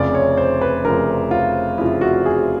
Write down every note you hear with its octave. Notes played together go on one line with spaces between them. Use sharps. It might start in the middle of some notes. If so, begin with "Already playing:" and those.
Already playing: F1 F2 C#3 F3 D5
C#5
C5
B4
F1 F2 C#3 F3 A#4
F4
F1 F2 C#3 F3 E4
F#4
G#4